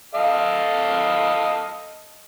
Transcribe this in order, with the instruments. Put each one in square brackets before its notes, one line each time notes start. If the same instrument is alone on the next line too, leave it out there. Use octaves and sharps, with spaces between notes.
[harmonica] A4 D#5 F5